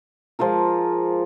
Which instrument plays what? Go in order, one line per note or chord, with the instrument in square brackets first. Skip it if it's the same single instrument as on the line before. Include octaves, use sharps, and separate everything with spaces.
[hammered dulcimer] F3 G#3 F4 A#4